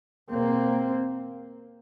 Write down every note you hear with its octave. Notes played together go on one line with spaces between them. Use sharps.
E2 B2 A#3 C4